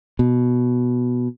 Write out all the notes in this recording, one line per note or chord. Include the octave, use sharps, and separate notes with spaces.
B2